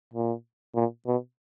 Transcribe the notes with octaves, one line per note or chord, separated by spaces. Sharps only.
A#2
A#2
B2